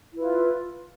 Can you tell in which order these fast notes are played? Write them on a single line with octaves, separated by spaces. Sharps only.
E4 B4 F4